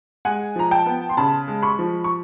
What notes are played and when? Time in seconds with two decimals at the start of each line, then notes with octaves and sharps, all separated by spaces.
0.25 G#3 F#5 G#5
0.56 F3 A#5
0.71 G5 A5
0.86 B3
1.10 C6
1.17 C#3 A5 B5
1.48 G#3
1.63 B5 C#6
1.79 F3
2.04 C#6